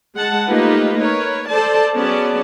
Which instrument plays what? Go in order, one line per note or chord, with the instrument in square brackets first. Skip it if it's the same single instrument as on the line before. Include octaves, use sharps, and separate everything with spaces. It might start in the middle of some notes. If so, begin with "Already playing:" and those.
[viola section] G#3 F#5 A5
A3 A#3 D#4 F4 G4 B4
A#4 B4 C#5
A4 C5 D5 A5
F#3 B3 C#4 G#4 D5 A5